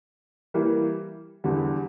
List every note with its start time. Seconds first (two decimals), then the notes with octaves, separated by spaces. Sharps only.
0.54 E3 G3 A#3 E4
1.44 E2 D3 G3